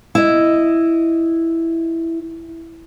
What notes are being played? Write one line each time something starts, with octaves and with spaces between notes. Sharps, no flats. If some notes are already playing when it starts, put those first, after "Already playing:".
E4 D#5